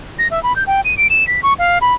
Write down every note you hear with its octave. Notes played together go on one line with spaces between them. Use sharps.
A#6
E5
B5
G6
G5
D#7
D7
E7
B6
C#6
F5
B5